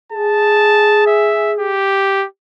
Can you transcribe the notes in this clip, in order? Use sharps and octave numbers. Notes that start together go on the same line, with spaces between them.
G#4 A5
E5
G4